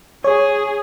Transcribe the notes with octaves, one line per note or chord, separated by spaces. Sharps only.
G#4 C#5